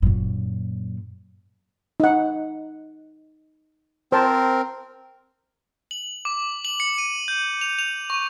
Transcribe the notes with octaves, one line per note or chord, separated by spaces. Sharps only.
F#2 A#2
D#4 F#5
C4 A#4 C5 A5
F#7
D6
F#7
C#7
D#7
G6
F7
F7
C#6